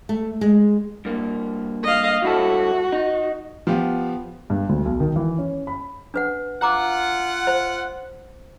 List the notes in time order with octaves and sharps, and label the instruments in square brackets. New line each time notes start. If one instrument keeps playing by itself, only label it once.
[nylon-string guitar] A3
G#3
[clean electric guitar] G2 A#3
[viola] D#5 F5
[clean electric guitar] G2 E4 A4 [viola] F#4
[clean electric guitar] D#4
[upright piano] F3 B3 G4 F5
[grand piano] G2
D2
B1
D#3
E3
C#4
B5
[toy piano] D4 B4 F#5
[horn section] F4 F#5 [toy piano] A#5 D6
[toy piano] C5